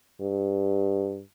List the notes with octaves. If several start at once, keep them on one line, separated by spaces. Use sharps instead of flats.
G2